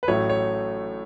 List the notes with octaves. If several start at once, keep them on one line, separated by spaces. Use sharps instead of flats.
B4
A1 A2 F#3 A3 C#5
C#5